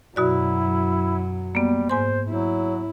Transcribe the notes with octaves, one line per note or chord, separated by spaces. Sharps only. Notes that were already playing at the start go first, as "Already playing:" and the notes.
F#2 B2 F#3 E4 F#4 D5
G3 A#3 B3
G#2 C5 G#5 C6
F#3 E4